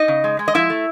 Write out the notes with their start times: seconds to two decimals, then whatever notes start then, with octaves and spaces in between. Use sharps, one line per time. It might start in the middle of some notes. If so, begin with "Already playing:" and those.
Already playing: D#4 D#5
0.08 C#3
0.24 G#3
0.39 G#3
0.48 D#5
0.54 F3 E4 E5
0.70 A3